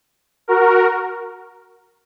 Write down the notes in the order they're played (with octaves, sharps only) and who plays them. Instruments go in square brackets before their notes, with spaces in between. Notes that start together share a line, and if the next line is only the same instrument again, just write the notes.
[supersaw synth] F#4 A#4